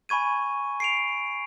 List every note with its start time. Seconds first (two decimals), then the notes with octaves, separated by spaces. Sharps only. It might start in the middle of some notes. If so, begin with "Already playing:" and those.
0.09 G#5 B5 C#6 G#6 D#7
0.80 C7 D7 F7